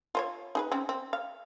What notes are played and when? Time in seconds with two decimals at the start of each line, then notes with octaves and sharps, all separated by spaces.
0.15 F4 C5 C#5
0.55 D#4 G#4 B4
0.72 C4 C#4
0.89 C4
1.13 F5